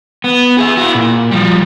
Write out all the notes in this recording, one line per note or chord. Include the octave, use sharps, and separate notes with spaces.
B3
G#4 E5
E4 F#4
A#2
F3 G3